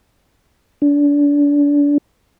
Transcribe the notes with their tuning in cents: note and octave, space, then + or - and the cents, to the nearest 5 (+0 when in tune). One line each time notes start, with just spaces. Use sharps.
D4 -30